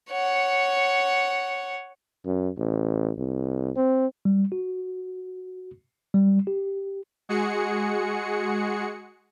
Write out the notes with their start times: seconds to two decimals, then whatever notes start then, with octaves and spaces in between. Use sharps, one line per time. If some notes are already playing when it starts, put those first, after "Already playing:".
0.10 C#5 F#5
2.26 F#2
2.58 A1
3.18 C2
3.76 C4
4.25 G3
4.52 F#4
6.14 G3
6.47 G4
7.29 G#3 F#4 G#4 C#7